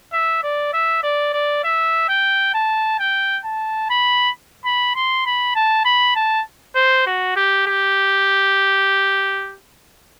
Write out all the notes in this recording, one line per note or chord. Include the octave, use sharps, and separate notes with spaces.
E5
D5
E5
D5
D5
E5
G5
A5
G5
A5
B5
B5
C6
B5
A5
B5
A5
C5
F#4
G4
G4